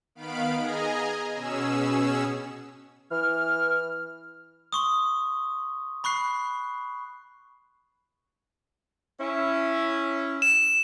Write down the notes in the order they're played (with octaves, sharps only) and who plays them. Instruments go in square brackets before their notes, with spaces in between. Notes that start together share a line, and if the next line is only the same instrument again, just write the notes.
[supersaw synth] D#3 B3 F5 B5 D7
G#4 D#5 G#5 A#5
B2 C#4 G#4 E6
[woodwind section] E3 F6
[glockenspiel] C6 C#6 D#6
B5 C#6 F#6 C7
[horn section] C#4 E4
[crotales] E7